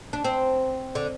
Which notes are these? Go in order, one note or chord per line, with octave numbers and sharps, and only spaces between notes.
D4
C4
D3